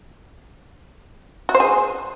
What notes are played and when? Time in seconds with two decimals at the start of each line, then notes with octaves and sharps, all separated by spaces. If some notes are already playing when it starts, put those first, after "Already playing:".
1.49 F#4
1.55 C5
1.60 G#4